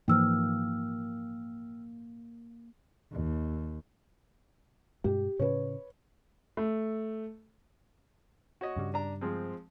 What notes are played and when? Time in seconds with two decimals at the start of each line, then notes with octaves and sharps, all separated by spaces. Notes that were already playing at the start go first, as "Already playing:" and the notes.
0.08 G#2 E3 F3 A#3 G5 E6 F6
3.12 D#2
5.04 G2 B2 G#3 G4
5.39 A2 C#3 C#4 B4 C#5
6.57 A3
8.61 F#4 C#5 D#5
8.77 G2 C#3 G3
8.94 D4 A#5
9.21 F3 G#3 C4